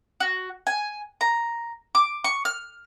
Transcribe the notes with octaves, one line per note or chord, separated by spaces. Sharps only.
F#4
G#5
A#5
D6
C#6
F6